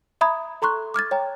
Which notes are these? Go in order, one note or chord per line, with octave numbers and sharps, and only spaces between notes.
E5 A#5 B5 D#6 G#6
A4 A#5 C6 C#6 F#6
D6 F6 G#6 A6
C#5 G5 A#5